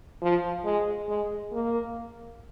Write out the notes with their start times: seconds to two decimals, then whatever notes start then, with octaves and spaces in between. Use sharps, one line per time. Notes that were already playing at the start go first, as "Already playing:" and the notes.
0.22 F3
0.64 G#3
1.08 G#3
1.52 A#3